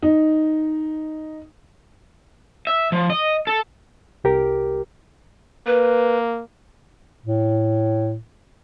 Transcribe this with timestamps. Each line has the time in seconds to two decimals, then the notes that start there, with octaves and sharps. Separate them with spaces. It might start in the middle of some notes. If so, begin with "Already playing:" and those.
0.03 D#4
2.67 E5
2.92 F3
3.10 D#5
3.47 A4
4.24 C2 G4 A#4
5.67 A#3 B4
7.24 A2